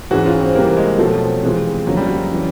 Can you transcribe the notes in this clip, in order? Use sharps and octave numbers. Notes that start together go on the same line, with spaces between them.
G#2 E3 G#3 C#4 F#4
F4
C4
C3 E3 G3 A#3
G#3
B2 F3 F#3 A3 C4
C3 E3 G#3 C4 F4
F#2 D3 F3 F#3 A#3 C#4
G3
F#3
C#3 E3